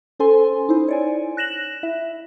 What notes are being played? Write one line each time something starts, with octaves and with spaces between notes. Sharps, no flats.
C#4 A4 C5 G#5 C6
D#4 E4 C5
C#5 D5 G#5
F#6 A#6 E7 F#7
E4 E5